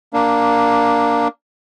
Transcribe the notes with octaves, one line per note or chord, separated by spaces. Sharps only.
A#3 D4